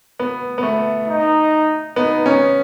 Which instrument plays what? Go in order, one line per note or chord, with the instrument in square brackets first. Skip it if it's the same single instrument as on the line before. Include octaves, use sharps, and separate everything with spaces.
[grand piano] B3
B3
A3
[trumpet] D#4
[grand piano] B3 [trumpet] D#4
[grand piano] C#4